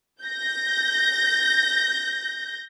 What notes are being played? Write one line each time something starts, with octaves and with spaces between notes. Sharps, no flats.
G6 A#6